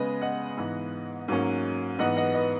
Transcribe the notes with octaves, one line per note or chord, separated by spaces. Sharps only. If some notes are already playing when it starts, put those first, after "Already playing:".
Already playing: C#3 G#3 B3 B4 D#5
D#5 F#5
G#2 E3 B3
G#2 F#3 A#3 C#4
G#2 E3 B3 D#5 F#5
D#5 F#5
B4 D#5